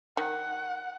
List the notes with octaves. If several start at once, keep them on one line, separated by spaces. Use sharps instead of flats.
D#3 F#5